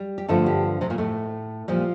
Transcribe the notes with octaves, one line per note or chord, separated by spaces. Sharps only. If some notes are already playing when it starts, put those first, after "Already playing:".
Already playing: G3
G4
G2 D3 F3 A3 A4
G3 G4
C3 C4
A#2 A#3
A2 A3
A#2 F3 G3